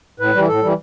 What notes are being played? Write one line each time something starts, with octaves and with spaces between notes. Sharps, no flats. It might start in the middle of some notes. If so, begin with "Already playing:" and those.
A2 B4
E3 G3
A2 A4
E3 G3